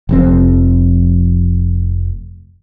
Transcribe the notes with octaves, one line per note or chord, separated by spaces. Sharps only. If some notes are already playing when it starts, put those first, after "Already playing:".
F1 F2 C4